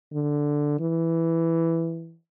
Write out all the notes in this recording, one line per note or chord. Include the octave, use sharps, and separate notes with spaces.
D3
E3